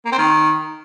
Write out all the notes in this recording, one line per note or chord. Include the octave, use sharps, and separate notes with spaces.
A#3
C4
D#3